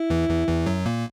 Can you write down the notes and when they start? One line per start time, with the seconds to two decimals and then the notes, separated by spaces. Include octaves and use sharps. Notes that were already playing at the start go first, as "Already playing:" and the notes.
Already playing: E4
0.10 E2 E3
0.29 E2 E3
0.47 E2 E3
0.66 F#2 F#3
0.85 A#2 A#3